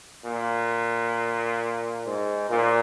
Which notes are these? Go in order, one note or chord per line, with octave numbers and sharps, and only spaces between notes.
A#2
G#2
A#2